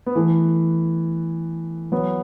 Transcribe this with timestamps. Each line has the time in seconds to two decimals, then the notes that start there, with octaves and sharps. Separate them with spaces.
0.06 B3
0.15 E3 A3
1.92 F#3 B3